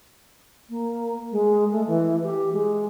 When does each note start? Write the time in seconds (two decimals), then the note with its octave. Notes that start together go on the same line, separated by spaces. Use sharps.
0.69 A#3
1.31 G#3
1.72 A3
1.86 E3
2.23 G4
2.53 G#3